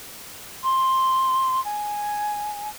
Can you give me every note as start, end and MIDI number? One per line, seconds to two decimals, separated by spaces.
0.63 1.62 84
1.64 2.68 80